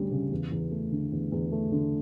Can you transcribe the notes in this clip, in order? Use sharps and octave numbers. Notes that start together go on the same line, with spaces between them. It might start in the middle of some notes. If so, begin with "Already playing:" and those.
Already playing: D2 G3 C#4
C#3
E2
E2
A3
D3
E2
E2
A3
D3